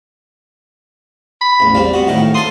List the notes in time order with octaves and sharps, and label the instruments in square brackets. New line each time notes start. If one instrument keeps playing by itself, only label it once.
[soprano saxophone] B5
[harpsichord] A1 E2
[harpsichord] G3 C4 [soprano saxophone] F5
[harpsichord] B3 F#4
A2 D#3 E4
[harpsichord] A4 B4 D#6 [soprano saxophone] C6